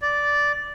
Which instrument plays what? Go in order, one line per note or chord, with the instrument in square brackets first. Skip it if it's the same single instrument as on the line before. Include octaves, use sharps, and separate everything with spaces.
[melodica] D5